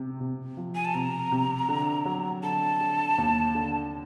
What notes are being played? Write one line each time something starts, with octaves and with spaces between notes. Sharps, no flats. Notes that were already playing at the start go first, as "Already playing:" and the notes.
Already playing: C3
C3
F3
G#5
A5
C3 A#5
C3
D3
F#3
D3 A5
D3
D#2
D3